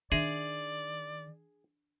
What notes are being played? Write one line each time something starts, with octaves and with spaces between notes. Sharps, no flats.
D#3 D4 G#4 D5 E5 A#6